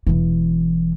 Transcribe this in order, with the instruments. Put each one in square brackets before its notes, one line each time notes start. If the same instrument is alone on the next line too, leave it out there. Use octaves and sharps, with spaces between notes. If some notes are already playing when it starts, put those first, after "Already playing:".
[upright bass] E1 E3